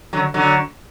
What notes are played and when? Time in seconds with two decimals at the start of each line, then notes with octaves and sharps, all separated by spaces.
0.13 D3 F#3
0.34 D3 F#3